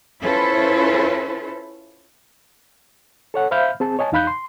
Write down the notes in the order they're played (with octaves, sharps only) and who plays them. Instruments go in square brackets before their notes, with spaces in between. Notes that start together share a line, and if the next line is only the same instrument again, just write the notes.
[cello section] C#4 E4 F4 A4 B4 C5
[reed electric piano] A4 C#5 F#5
C5 E5 F5 B5 F6 G6
C4 G#4 A5
C#5 D#5 G#5 A5
E2 D#4 F5 B5 F#6 G6
C6